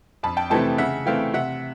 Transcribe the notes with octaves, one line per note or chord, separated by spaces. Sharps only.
F2 A5 B5
G5 A5
C3 E3 A3 C4 G5 A5
C#3 E5 F#5
E3 A3 C4 F5 G5
C3 E5 F#5